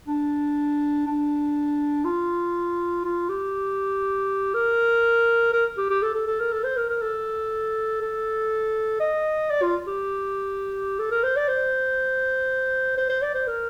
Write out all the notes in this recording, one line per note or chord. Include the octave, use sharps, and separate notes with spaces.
D4
D4
F4
F4
G4
A#4
A#4
G4
G4
A4
A4
A4
A#4
A4
C5
A#4
A#4
A4
A4
D#5
D5
F4
G4
A4
A#4
C5
D5
C5
C5
C5
D5
C5
A#4